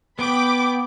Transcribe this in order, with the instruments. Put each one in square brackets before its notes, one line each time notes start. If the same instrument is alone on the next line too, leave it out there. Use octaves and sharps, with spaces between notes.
[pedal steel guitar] B3 [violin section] G5 B5 D6